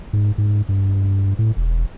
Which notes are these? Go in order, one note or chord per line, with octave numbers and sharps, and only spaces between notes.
G#2
G#2
G2
A2
E1